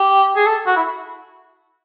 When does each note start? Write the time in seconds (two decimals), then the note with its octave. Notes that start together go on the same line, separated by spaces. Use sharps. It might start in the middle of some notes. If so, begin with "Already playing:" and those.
Already playing: G4
0.36 G#4
0.46 A4
0.66 F#4
0.76 E4